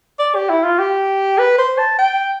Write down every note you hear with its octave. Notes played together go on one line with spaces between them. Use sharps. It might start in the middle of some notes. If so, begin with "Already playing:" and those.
D5
G4
E4
F4
G4
B4
C5
A5
G5